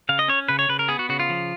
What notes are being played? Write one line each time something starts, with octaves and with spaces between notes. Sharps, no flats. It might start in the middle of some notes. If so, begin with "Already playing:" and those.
C#3 F5
D#5
C#4 C#5
C#3 B4
C#5
C#3 B4
A#4
B3 G#4
F#4
C#3 F#4
F4
F3